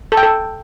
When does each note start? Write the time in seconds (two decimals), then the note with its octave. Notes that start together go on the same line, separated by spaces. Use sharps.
0.12 A4
0.17 G5
0.23 A4